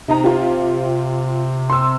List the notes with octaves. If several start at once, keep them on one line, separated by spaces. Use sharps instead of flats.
C3 D#4 D#5 A#5
F4 G4
C6 E6